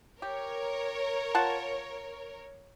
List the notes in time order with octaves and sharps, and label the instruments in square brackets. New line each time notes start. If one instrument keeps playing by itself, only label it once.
[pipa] G4 [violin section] A#4 C#5
[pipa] F4 F#5 A5